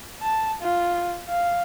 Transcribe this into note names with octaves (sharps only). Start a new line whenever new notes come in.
A5
F4
F5